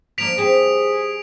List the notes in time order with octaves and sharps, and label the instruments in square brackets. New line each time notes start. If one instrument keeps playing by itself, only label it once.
[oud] F3 A#3 D4 [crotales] B6 D7 F7
[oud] C4 G4 [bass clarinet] G#4